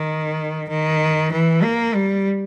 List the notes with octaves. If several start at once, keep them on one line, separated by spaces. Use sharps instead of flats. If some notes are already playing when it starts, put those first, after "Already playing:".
Already playing: D#3
D#3
E3
A#3
G3